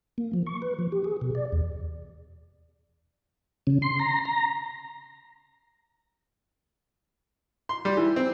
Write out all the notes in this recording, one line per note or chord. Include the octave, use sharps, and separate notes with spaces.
A#3
F3
C#6
B4
F3
G4
G#4
B2
D5
E2
C#3
C6
A#5
A#5
C6
G3
E3
C4